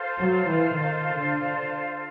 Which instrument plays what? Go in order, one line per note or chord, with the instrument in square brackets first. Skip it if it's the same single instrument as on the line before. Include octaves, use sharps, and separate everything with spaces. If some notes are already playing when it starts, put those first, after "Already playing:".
Already playing: [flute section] F4 A4 C5 F5
[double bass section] F#3
E3
D#3
D3